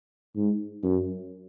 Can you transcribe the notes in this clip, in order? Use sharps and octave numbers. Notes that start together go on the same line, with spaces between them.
G#2
F#2